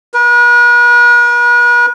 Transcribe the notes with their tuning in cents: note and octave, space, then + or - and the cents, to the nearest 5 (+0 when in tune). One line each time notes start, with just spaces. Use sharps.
B4 -45